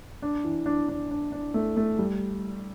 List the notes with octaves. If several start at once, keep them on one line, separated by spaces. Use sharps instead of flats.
D4
E3
D4
D4
D4
D4
A3
A3
G3